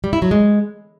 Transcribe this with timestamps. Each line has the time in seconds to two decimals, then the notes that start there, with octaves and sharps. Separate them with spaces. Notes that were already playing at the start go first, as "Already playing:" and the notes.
0.04 G3
0.13 E4
0.22 F#3
0.31 G#3